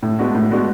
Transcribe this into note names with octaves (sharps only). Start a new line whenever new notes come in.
A2
G#3 B3 D4 F#4
A2
G#3 B3 D4 F#4